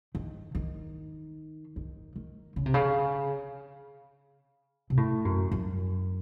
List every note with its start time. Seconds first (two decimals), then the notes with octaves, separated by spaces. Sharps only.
0.15 D#3
0.55 D#3
1.76 D#3
2.16 D#3
2.56 C#3
2.66 C3
2.74 C#3
4.90 C3
4.97 A2
5.25 F#2
5.52 F#2